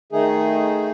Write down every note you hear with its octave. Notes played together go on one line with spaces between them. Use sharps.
D#3 A3 D#4 G#4